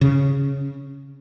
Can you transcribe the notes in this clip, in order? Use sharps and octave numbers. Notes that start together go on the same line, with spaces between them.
C#3